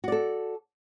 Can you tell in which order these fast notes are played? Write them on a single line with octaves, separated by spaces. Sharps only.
F#4 D5 A4